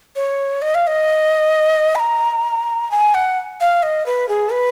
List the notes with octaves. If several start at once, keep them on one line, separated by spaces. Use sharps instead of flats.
C#5
D#5
F5
D#5
B5
A#5
G#5
F#5
F5
D#5
B4
G#4
B4